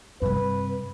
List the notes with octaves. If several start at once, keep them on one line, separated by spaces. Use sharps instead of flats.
G2 C3 B4